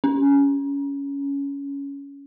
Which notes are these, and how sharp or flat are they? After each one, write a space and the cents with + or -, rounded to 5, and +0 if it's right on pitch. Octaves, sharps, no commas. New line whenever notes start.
C#4 +15